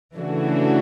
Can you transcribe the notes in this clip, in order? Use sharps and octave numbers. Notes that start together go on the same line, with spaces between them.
C#3 E3 A3 D4 F#4